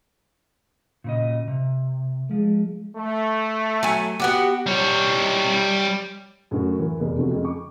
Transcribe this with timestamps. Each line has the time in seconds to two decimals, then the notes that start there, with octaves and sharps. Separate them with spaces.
1.04 A#2 C#3 D#5
1.48 C3
2.31 F3 G#3
2.96 A3
3.83 F#3 G#5
4.20 B3 F#4 G4
4.66 G3 C#5
6.51 F#2 A2 C#3 F#4
6.79 E3 A#4
6.99 F1 E2 B2 A#4
7.18 C3 F3 A3 F#4
7.31 F2 C#3 G#3
7.45 C#6 D6